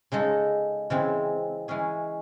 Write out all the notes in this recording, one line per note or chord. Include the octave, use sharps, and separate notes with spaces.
C#3 G#3 D#4 A4
C#3 E3 G#3 C4
E3 G#3 C#4 G#4